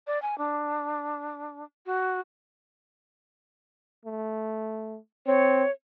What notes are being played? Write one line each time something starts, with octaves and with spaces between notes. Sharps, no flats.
D5
G#5
D4
F#4
A3
C4 C#5